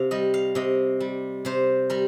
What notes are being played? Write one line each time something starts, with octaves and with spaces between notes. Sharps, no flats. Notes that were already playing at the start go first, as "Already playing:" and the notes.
Already playing: C3 F5
G3 D#5
F5
C3 D#5
G3
C3 C5
G3 A#4